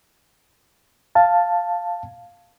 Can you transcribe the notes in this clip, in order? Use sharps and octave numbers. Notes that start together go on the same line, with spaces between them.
F5 A5